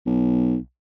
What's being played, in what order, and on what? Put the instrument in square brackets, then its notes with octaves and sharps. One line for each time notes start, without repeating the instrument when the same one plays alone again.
[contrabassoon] B1